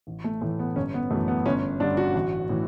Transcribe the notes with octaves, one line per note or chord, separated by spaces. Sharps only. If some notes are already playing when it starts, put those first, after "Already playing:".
A1
A3
A2 E3 A3
B3
G1 C#4
B3
F#2 E3 A3
B3
G1 C#4
G2 D3 D4
F#4
A1
A2 E3